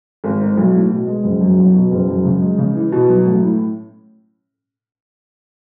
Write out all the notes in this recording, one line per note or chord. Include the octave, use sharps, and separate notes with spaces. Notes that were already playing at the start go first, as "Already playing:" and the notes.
G#1
G#2
B1
A2
B2
G#3
F#1
F#2
B1
B2
F#1
F#2
C#3
G#3
C#3
E3
B2
F#3
A1
A2